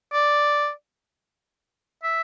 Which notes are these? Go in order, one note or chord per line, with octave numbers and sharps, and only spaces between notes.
D5
E5